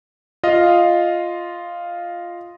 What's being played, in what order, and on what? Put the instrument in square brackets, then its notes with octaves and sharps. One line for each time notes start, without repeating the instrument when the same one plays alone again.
[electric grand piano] F4 D#5 F5